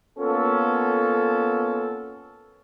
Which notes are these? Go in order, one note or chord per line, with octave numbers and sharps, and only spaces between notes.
A#3 B3 C#4 F4 A4